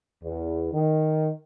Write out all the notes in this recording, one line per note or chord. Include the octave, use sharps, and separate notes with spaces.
E2
D#3